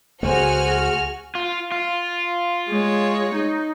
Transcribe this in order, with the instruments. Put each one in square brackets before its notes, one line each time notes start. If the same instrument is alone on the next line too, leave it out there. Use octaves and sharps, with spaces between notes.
[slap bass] C#2 A3 [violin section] F#4 F6 [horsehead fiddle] G#4 G#5 [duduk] C5
[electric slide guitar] F4
F4
[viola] G#3 C#5
D#4